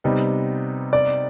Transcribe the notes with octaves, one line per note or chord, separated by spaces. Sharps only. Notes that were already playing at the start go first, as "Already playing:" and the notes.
C3 G3 B3 D#4
D5